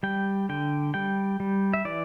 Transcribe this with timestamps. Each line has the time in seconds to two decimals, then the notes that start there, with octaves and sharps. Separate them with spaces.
0.03 G3 G5
0.49 D3 G5
0.94 G3 G5
1.40 G3
1.73 E5
1.85 E3 D5